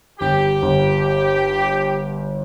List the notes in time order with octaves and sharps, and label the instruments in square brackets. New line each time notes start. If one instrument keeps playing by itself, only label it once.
[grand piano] G1 [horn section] G4
[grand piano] G1